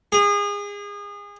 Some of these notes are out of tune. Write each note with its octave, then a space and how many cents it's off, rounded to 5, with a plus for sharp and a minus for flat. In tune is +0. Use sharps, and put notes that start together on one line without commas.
G#4 -30